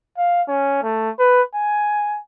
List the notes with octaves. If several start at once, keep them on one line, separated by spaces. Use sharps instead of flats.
F5
C#4
A3
B4
G#5